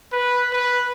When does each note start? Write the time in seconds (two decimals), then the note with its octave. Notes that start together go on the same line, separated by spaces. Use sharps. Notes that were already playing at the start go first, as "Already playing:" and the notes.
0.13 B4
0.53 B4